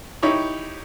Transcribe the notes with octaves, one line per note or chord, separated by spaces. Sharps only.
D#4 E4 G4 C#5